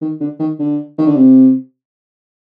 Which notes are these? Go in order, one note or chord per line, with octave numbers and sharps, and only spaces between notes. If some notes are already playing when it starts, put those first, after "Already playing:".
D#3
D3
D#3
D3
D#3
D3
C3